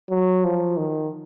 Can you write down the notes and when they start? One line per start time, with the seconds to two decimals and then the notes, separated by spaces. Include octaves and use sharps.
0.10 F#3
0.44 F3
0.77 D#3